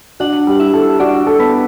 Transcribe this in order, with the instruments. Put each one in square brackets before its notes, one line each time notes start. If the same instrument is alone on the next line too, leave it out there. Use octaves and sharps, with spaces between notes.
[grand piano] D4 [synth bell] F#4 F#5
[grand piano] G3
[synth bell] E4 E5
[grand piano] A4
[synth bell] D4 D5 [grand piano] F#4
[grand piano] A4
[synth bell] B3 B4